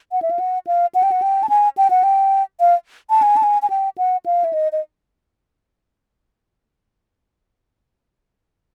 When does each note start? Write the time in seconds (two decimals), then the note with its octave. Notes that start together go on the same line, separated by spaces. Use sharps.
0.12 F#5
0.22 E5
0.31 F5
0.39 F#5
0.67 F5
0.95 F#5
1.03 G5
1.12 F#5
1.22 G5
1.43 A5
1.49 G#5
1.77 G5
1.90 F#5
2.03 G5
2.60 F5
3.10 A5
3.22 G#5
3.37 A5
3.43 G#5
3.62 G#5
3.70 G5
3.98 F#5
4.26 F5
4.44 E5
4.53 D#5
4.72 D#5